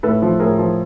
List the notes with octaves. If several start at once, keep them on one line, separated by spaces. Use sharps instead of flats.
A2 A4 B4
F3
A2 G#4 A#4
F3